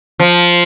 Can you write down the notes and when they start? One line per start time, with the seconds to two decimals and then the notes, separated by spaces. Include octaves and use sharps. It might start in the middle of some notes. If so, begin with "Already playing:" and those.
0.20 F3